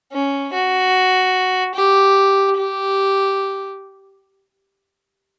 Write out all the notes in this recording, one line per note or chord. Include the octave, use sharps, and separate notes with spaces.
C#4
F#4
G4
G4